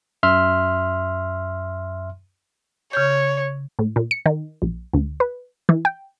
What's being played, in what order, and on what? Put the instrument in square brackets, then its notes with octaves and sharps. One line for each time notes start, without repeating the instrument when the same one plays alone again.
[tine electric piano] F#2 E5 C6 F6
[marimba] C#3 C#6 G6 [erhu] C#5
[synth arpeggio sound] A2
A#2
C#7
D#3
A#1
D2
B4
E3
G5